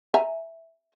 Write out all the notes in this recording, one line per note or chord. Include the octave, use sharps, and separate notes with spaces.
E5 G#5 A#5